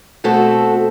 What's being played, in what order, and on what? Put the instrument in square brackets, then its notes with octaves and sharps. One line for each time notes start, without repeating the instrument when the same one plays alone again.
[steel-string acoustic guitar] B2 A3 C4 F#4 A4